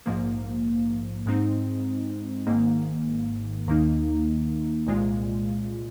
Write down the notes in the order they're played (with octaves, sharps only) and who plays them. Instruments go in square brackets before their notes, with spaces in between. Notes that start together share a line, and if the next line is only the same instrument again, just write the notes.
[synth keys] A#1 G#2 F3 A#3
G#2 G#3 C4 D#4
G#1 G#2 D#3 A#3
D#2 D#3 A#3 D#4
C2 A#2 G#3 F4